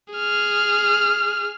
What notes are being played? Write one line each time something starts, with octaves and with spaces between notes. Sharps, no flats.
G#4 F6